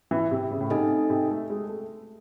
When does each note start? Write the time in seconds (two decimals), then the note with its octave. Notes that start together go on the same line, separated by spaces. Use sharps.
0.11 E3
0.31 C3
0.51 C#3
0.61 A2
0.70 C3 C4 D#4 A4 D#5 G#5
1.10 C3
1.30 A3
1.50 G#3
1.69 A3